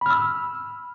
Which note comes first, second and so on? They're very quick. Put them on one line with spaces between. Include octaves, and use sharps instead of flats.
B5 F6 E6